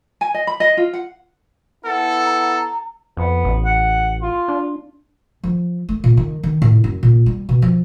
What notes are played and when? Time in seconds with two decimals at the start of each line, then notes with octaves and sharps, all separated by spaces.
0.21 G#5
0.34 D#5
0.47 B5
0.60 D#5
0.77 F4
0.93 F#5
1.85 B3 E4 A4 F#5
2.26 A#5
3.17 F2 B3
3.44 A1
3.65 F#5
4.22 F4
4.48 D4
5.44 F3
5.89 A3
6.04 A#2
6.17 D#3
6.43 D#3
6.62 A2
6.84 F#2
7.03 A#2
7.26 G3
7.49 B2
7.62 F3